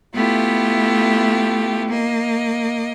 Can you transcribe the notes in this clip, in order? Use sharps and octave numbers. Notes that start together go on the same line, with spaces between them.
A3 B3 E4 F4 G4
A#3 D#5